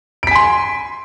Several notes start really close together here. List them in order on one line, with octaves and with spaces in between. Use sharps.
D7 B6 G#5 C6